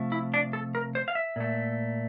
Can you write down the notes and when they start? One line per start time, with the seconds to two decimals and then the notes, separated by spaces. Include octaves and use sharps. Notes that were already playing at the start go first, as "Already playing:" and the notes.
Already playing: C3 F3 A3
0.12 E4
0.34 D4
0.53 A4
0.75 A#4
0.95 C5
1.08 F5
1.15 E5
1.36 A#2 A3